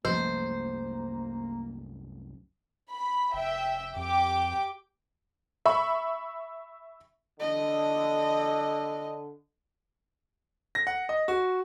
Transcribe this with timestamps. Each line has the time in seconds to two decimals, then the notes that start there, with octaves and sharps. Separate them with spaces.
0.05 C2 F#2 F3 A3 A#3 C5
2.91 B5
3.33 F1 E5 G5
3.96 F2 G4 G5 D6
5.66 E5 B5 C#6
7.40 D3 D#5
10.75 A#6
10.87 F#5
11.09 D#5
11.28 F#4